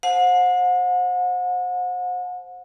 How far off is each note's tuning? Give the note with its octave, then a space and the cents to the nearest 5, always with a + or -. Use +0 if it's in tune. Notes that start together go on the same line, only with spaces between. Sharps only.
C5 +0 F#5 -40 A5 -30